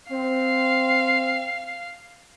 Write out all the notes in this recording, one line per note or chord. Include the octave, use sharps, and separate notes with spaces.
C4 F5